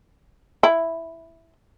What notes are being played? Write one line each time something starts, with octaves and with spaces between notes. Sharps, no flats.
E4